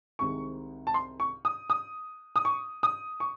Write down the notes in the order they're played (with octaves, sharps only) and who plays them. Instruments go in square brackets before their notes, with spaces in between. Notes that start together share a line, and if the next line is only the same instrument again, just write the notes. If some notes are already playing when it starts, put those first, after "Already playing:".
[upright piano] C2 C3 D#3 G#3 C#6
A5
C6
C#6
D#6
D#6
D#6
C#6
D#6
C#6